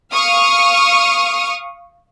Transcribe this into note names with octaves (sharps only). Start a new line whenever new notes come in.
F5 C#6 D#6 F6